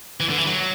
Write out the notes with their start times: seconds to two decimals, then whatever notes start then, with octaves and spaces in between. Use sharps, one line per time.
0.20 E3
0.30 D3
0.38 E3
0.47 F#3